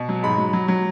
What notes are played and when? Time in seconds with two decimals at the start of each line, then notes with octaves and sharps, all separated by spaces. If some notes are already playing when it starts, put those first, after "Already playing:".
Already playing: B2
0.09 F#3
0.23 G#2 B5
0.38 F#3
0.53 F#3
0.68 F#3